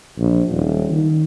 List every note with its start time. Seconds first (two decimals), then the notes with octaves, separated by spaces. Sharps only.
0.18 A#1
0.51 D#1
0.91 D#3